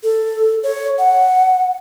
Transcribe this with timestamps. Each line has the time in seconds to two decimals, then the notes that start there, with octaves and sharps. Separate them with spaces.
0.03 A4
0.63 C#5
0.98 F#5